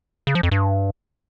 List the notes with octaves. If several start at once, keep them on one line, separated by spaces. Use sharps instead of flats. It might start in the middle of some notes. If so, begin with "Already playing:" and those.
C#3
F3
F2
G2